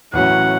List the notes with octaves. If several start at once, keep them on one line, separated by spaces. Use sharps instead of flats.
A1 A2 F#3 C#4 F#5